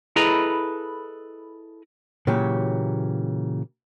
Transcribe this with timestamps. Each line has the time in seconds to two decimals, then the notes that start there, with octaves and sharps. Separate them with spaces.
0.16 E4 G#4 A4 B4 D#5 A#5
2.27 A#2 C#3 E3 F#3 G4